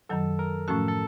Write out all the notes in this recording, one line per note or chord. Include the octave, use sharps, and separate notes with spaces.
F#2 D#3 F#3 A4
A#4
A2 F3 A3 C#4 F#4 A4
A4